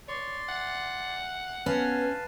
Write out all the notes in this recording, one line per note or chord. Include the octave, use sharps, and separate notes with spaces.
C#5 D5 C6
F#5
B3 C#4 B4 F5 A5